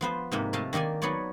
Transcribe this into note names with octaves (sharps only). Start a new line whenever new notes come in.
F3 B3 C5
G#2 C3 A#3
C3 A3 D#5 F5 A5
D#3 A#3 D#4 D5 G#5
F#3 B3 D#4 C#5 D5